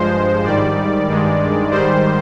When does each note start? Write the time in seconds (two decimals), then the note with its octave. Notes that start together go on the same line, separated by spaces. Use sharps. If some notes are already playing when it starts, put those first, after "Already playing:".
Already playing: G2 F3 G#3 C5
0.44 G#2 D#3 G3 D5
1.07 G2 D#3 G#3
1.70 G#2 D#3 G3 C5